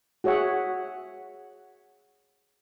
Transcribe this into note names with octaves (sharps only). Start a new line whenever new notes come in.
F#4 G#4 C#5 E5 F#5